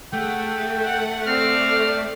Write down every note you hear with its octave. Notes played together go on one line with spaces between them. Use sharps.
A3 G#4 F#5 G5
F#5
C4 A4 D5 F6